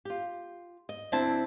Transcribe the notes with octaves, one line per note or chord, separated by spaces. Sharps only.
F4 G4
D#5
D2 C4 D4 E4 A5